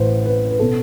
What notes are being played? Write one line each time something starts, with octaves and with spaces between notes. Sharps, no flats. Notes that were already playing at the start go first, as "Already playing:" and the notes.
Already playing: A1 A2 E3 B4 C5
B4
B4
B2 A4